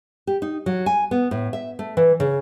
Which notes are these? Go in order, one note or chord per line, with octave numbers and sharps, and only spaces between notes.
G4
D#4
F#3
G#5
B3
A2
E5
A3
E3
C#3